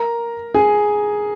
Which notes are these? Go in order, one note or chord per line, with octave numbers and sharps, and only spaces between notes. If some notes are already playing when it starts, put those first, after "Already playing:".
Already playing: A#4 A#5
G#4 G#5